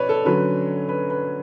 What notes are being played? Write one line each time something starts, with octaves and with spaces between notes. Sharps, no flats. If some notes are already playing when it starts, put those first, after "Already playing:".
Already playing: B2 C#4 B4 C#5 D5
A4
D3 F#3 C#4 B4
B4
B4